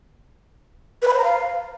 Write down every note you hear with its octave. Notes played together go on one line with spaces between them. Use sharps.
B4
B5
C5
A#5
F5